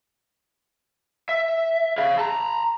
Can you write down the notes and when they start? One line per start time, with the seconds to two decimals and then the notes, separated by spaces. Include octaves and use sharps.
1.29 E5
1.98 G#4 F5
2.18 A5 A#5